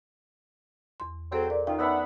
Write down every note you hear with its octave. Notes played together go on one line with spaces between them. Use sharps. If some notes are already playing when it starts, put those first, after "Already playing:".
E2 C6
F#3 C4 G#4 A4 C5
A#2 D5
D#3 F4 G5
B3 C#4 D4 E5 F#5 B5